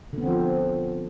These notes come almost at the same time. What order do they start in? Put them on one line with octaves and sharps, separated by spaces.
D3 B3 C4 F3